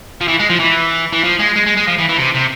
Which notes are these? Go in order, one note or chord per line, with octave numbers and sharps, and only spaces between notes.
F3
E3
G#3
F3
E3
E3
F3
G#3
G#3
G#3
G#3
F3
E3
E3
C3
C3